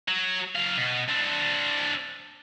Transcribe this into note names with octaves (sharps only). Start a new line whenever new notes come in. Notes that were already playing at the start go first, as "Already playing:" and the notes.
F#3
F#3 F5
B2
C4 D4